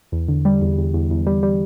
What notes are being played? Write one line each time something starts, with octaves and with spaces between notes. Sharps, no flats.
E2
D3
G3
E2
E2
E2
E2
G3
G3